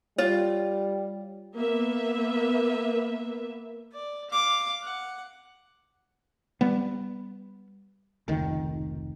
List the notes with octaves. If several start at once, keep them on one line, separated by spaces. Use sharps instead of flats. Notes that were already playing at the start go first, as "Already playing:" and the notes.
G3 F4 C#5
A#3 B3 B4 E5
D5
F5 D6
F#5
G3 B3
F1 C#2 D#3